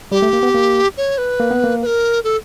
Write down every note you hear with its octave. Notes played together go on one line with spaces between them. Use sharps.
G3 G4
A3
A#3
B3
A#3
C#5
B4
A#3
B3
A#3
B4
A#4
A4